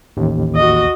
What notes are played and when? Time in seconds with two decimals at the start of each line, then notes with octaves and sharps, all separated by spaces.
0.17 A1 D#2
0.56 F#4 D#5